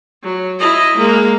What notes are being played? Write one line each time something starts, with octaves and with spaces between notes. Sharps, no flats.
F#3
E4 D#5
G#3 A#3